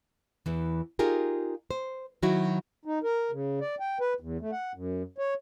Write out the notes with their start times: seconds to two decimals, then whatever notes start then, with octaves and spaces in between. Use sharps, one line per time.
0.46 E2 E3
0.99 D#4 F4 G4 G#4 A#4
1.71 C5
2.22 D#3 F#3 E4 F#4
2.85 D#4
3.03 A#4
3.31 C#3
3.61 D5
3.80 G5
4.00 B4
4.20 E2
4.41 A3
4.52 F#5
4.75 F#2
5.18 C#5